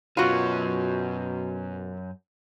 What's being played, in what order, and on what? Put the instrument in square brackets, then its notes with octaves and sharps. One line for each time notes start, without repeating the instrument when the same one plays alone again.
[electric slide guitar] F#2 C#4 [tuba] B2 [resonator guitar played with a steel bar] F4 F#4